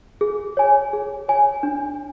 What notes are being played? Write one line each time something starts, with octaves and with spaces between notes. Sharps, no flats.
G#4
C#5 G#5
G#4
C#5 G#5
D4